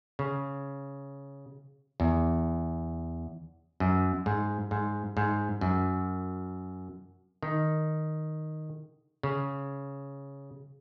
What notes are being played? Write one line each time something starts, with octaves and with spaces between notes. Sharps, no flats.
C#3
E2
F#2
G#2
G#2
G#2
F#2
D#3
C#3